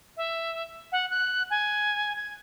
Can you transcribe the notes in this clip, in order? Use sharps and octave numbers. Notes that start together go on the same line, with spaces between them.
E5
F#5
F#6
G#5
G#6